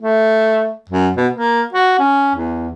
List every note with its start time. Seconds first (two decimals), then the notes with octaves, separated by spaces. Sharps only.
0.02 A3
0.90 F#2
1.17 B2
1.34 A#3
1.73 F#4
1.99 C#4
2.36 E2